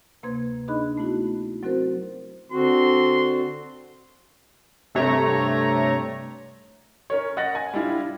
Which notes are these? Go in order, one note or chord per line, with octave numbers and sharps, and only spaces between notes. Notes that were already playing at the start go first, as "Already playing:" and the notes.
D2 C3 A#3 B4 C6 G#6
D4 D#4 G#4 D#5 B5 F#6
A3 B3 E4 F#4
F#3 C4 F#4 A#4 C5
D3 C4 F#4 C6
G2 C3 A3 C#5 A#5
C#4 A#4 C#5
D#5 F#5 A6 A#6
G#5
G3 D4 E4 F4